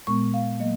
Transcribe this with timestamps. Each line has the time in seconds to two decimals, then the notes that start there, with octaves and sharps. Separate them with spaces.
0.07 A#2 G#3 B3 C#6
0.34 F5
0.60 F#3 A#3 D#5